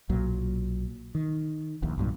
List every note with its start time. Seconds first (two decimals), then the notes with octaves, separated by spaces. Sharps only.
0.09 B1 A#2 F#3
1.15 D#3
1.82 D#1 A#1 D#2
1.98 B1 G2 A#2